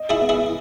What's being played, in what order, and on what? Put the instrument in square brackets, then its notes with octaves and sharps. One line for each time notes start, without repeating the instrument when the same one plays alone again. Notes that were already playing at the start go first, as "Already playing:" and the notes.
Already playing: [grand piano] D#5
[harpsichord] E4 G#4
[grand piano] B3
[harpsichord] E4 G#4